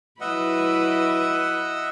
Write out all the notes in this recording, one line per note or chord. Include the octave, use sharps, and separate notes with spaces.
F#3 E4 B4 D#5 E5 F#5